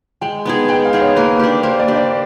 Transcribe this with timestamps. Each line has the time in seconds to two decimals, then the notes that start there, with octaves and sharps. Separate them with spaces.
0.21 G#3 G5
0.45 B3 D#4 G#4
0.68 G#3 G5
0.85 F5
0.93 B3 D#4 G#4
1.01 C#5
1.16 A#3 B4
1.39 D4 G4
1.63 A#3 C5
1.79 D5
1.88 D4 G4
1.96 D5